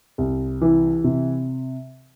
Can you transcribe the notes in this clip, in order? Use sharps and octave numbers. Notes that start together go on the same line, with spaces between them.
C2
E3
C3